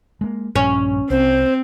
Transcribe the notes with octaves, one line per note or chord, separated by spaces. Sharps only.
G#3 A#3
A#1 G2 C#4
C2 C4 C5